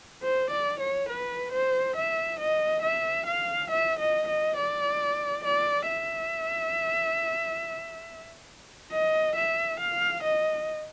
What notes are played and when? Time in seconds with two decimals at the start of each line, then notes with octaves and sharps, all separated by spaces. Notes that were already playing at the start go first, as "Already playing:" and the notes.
0.23 C5
0.51 D5
0.80 C#5
1.09 B4
1.53 C5
1.97 E5
2.40 D#5
2.83 E5
3.27 F5
3.71 E5
3.99 D#5
4.28 D#5
4.57 D5
5.44 D5
5.89 E5
8.92 D#5
9.36 E5
9.80 F5
10.23 D#5